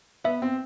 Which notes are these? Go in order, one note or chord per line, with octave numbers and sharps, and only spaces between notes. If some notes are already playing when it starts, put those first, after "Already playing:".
B3 E5
C4